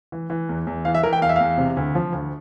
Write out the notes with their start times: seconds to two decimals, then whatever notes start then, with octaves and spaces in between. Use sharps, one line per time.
0.12 E3
0.30 E3
0.49 E2
0.67 E2
0.85 E3 F5
0.94 E5
1.03 E3 A#4
1.13 G5
1.21 E2 F5
1.29 E5
1.36 E2 F5
1.58 C3
1.77 D2
1.95 F3
2.12 D2